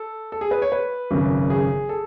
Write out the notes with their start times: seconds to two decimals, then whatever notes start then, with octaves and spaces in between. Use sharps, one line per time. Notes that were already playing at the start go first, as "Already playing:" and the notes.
Already playing: A4
0.32 A4
0.41 G#4
0.51 B4
0.62 C#5
0.72 B4
1.11 G#1 F#2 C#3
1.50 G#4
1.89 A4